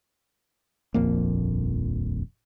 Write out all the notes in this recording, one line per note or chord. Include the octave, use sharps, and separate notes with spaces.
D#1 A#1 F2 A#3